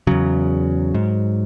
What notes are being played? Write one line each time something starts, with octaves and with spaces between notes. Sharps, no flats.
E2 C#3 F#3
G#2